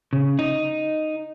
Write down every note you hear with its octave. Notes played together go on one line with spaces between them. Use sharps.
C#3
D#4